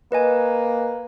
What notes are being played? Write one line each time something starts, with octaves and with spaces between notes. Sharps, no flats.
A#3 B4 D#5 G#5